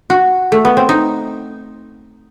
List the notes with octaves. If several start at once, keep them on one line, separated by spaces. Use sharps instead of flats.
F#4
A3
B3
C4
D#4